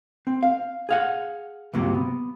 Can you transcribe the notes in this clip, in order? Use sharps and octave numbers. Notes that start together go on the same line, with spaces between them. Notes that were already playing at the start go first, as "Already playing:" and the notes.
C4
F5
G#4 F5 F#5
C#2 G2 C3 F#3 A#3
B3